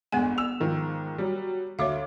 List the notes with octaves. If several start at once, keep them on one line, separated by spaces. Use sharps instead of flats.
G1 G#3 B3 F#5 G#5
E6 F7
G#2 D#3 F3
F#3 G3
D2 C#5 E5 F5 D6